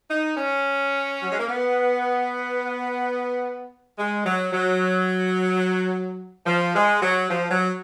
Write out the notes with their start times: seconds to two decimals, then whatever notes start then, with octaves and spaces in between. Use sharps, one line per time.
0.10 D#4
0.37 C#4
1.22 F#3
1.31 G#3
1.39 A#3
1.48 B3
3.98 G#3
4.25 F#3
4.53 F#3
6.46 F3
6.75 G#3
7.02 F#3
7.30 F3
7.51 F#3